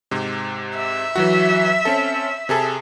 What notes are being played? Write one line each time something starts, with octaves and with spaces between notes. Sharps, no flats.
G#2 C3
E5
E3 F#3 F#4
C4 C#4 A4
C3 G#4 A4